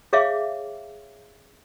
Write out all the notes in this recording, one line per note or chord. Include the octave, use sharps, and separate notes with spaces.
G#4 C#5 E5 F5 D6